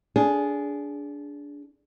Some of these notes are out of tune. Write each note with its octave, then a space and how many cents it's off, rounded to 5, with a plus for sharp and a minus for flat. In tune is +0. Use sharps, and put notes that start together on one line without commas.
D4 -20 G#4 +0